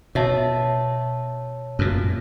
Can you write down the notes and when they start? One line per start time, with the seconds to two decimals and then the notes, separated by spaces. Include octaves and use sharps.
0.15 B2 C#5 E5 A5
1.79 F#2 A#2